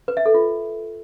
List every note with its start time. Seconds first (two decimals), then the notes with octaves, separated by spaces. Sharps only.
0.08 B4
0.17 E5
0.26 A4
0.34 F4